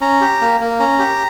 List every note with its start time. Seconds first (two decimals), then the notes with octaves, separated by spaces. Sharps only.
0.01 C#4 A#5
0.21 G4
0.41 A#3
0.60 A#3
0.80 C#4 A#5
0.99 G4